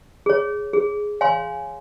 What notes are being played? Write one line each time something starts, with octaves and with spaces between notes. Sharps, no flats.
G#4 C#5
G#4
C#5 F5 G#5 C6